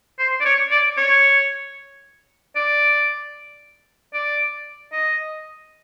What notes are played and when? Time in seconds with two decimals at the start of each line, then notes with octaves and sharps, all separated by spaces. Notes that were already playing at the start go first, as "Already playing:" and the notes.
0.19 C5
0.41 D5
0.45 C#5
0.71 D5
0.97 C#5
2.56 D5
4.14 D5
4.92 D#5